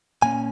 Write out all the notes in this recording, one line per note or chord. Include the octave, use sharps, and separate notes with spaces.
A#2 A#3 C#4 G#5